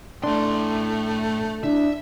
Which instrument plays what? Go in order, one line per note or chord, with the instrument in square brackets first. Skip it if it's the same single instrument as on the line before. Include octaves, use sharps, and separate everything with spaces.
[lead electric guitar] A2 C6 [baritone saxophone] A3 [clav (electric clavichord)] D4
[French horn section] D4 E4 [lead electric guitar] E5